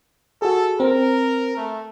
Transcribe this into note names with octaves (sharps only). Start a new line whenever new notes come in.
F#4 G#4 A4
C4 A#4
A3